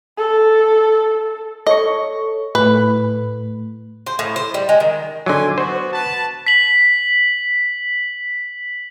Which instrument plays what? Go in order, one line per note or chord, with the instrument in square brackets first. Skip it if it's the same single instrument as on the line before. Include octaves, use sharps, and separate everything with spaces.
[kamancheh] A4
[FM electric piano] A4 C#5 C#6 [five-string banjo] D#5
[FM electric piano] A2 A3 [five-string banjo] B4
[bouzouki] C5
A2
C5
G3
G#3
D#3
[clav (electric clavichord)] D3 F#3 [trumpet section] G#5 C6 D6
[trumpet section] B3 F#4 [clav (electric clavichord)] C5
[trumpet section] B4 A5
[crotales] B6 F#7